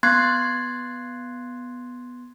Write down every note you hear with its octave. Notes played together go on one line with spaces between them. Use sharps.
B3 C6 F#6 G#6 A6 C7